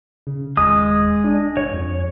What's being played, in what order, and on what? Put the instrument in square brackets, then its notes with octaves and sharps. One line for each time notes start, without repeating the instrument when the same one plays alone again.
[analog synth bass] C#3
[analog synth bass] D#1 [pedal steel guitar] G#3 D#6
[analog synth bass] D4
[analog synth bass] G1 [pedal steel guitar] C#5
[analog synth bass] F2